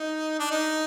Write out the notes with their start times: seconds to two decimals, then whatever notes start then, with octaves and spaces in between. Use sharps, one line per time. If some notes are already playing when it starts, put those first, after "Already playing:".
Already playing: D#4
0.39 D4
0.51 D#4